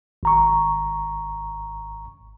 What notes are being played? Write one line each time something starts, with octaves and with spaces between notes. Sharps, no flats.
G#1 A#5 C#6